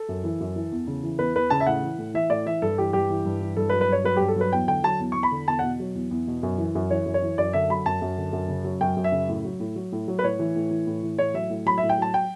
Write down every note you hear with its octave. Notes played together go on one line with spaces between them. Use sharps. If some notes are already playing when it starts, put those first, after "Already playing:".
Already playing: A4
F#2
E3
F#2
E3
E2
C#3
E3
E2 B4
E2 B4
C#3 A5
E5
A2 F#5
E3
A2
E3 E5
A2 D5
E3 E5
G2 A4
E3 G4
G2 G4
E3
G2
E3
G2 A4
B4
F#3
B4
G2 C#5
F#3 B4
G2 G4
A4
F#3 B4
E2 G5
D3 G5
F#3 A5
E2
E2 C#6
B5
D3
E2 A5
B2 F#5
F#3
E2
E2
B2
F#2
E3
F#2
E3 C#5
F#2
C#5
E3
F#2 D5
D3 E5
F#3 B5
F#2 A5
F#2
D3
F#2
C#3
F#3
F#2 G5
F#2
E5
C#3
A2
F#3
A2
F#3
A2
F#3
B4
A2 C#5
E3
A2
E3
A2
E3
A2 C#5
F#3 E5
A2
F#3 B5
A2 E5
G5
F#3 A5
G5